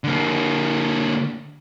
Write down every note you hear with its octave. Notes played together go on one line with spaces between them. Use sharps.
D3 A#3